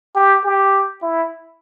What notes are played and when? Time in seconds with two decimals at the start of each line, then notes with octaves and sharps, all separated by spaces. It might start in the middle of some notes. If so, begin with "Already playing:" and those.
0.16 G4
0.45 G4
1.02 E4